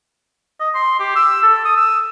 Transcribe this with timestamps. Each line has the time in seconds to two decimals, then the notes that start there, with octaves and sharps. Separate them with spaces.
0.60 D#5
0.75 C6
0.99 G4
1.16 E6
1.43 A4
1.65 D#6
1.77 E6